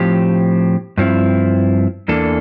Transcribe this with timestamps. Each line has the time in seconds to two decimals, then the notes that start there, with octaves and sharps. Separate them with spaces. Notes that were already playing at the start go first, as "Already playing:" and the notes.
Already playing: A2 F3 C4 G4
0.98 G2 F3 C4 E4
2.08 E2 E3 A#3 D4 A4